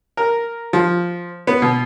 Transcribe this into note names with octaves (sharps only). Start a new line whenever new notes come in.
A#4
F3
B3
B2